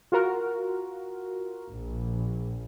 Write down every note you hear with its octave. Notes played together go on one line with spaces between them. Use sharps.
F4 F#4 A#4
A#1